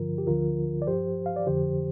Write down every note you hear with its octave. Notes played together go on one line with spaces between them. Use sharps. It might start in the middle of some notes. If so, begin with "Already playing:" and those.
Already playing: G2 D3 F3 F4 A#4
G4
D2 D3 F3 F4 A#4
D5
G2 F3 G4 C5
F5
D5
F2 D3 F3 G4 C5